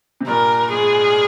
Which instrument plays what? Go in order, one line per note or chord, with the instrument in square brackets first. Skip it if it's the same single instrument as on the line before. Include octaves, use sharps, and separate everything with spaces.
[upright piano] C3
[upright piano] G2 A#2 [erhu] A#4
[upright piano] G#2 [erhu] G#4